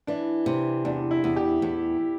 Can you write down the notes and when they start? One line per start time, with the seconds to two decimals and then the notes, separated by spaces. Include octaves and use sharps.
0.07 E3 D4
0.46 C3
0.85 E2 D4
1.11 E4
1.24 E2
1.36 G4
1.62 E2